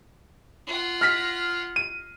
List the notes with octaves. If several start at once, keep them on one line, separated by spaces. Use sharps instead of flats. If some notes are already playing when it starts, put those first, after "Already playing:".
F4 F#5
F6 A#6 B6
D#7